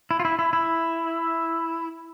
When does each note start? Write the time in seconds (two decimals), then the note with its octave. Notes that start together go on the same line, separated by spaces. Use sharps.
0.11 E4
0.20 F4
0.25 E4
0.39 E4
0.53 E4